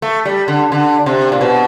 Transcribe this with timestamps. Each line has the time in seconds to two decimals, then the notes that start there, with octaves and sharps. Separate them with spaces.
0.02 A3
0.25 G3
0.48 D3
0.72 D3
1.06 C3
1.32 A#2
1.41 B2